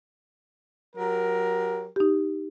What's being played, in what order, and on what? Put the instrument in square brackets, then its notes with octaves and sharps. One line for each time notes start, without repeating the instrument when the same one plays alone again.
[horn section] F#3 G4 A#4
[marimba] D#4 G4